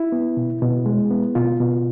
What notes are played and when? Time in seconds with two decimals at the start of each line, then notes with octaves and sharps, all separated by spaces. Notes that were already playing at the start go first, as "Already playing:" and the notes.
Already playing: E4
0.12 B3
0.37 B2
0.62 B2
0.86 G#3
1.11 B3
1.35 B2 F4
1.60 B2